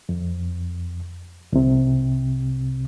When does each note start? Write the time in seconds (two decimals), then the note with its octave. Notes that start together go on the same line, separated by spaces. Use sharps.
0.09 F2
1.53 C2 C3